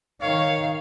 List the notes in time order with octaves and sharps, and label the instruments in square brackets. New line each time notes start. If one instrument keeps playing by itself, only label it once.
[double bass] D#3 [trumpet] C#5 [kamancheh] F5